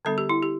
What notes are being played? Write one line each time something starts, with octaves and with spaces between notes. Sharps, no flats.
D3 G3 B3 D4 A4
G4
E4
G4